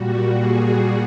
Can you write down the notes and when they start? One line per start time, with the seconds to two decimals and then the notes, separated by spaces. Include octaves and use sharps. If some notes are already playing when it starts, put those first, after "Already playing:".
Already playing: A#2 G3 F#4
0.33 G#4